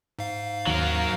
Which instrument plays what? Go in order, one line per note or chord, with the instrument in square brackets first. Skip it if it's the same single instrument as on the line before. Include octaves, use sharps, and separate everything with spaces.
[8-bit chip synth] G#2 F5
[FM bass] D#2 [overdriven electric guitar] F#3 A#4